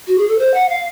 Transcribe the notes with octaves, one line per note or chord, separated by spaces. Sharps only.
F#4
G#4
A4
C5
F#5
F5